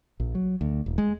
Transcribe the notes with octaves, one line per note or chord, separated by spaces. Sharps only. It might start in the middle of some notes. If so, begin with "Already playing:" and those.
A#1
F#3
D2
D#1
G#3